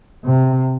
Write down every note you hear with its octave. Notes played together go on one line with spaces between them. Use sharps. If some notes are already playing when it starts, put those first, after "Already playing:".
C3